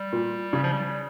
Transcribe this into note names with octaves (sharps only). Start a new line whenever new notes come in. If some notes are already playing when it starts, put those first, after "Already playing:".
Already playing: G3
A#2
C#3
F3
G3